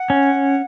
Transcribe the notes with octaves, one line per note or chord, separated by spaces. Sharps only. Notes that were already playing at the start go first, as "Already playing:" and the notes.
Already playing: F#5
C#4